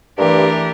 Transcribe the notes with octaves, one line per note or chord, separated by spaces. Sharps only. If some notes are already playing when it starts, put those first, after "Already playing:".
G2 E3 A3 D4 G4 A#4